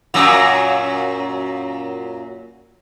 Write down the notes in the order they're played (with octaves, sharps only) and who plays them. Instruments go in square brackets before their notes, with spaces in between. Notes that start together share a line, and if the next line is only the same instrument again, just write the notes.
[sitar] F#2 A#2 F#3